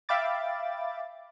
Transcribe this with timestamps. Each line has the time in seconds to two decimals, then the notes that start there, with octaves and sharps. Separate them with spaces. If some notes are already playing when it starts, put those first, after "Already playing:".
0.09 E5 F5 G5 B5 D6 A6